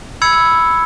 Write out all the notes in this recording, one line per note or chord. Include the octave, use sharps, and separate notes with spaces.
B5 E6 G#6 C#7